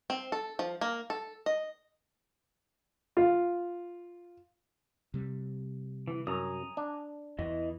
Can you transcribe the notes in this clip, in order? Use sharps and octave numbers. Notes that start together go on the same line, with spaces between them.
C4
A4
F3
A#3
A4
D#5
F4
C3 G3
E3
F#2 G#5 A#5 D#6
D4
E2 E3 E4 D#5